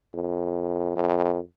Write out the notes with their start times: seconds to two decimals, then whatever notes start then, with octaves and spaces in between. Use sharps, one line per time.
0.14 F2
0.96 F2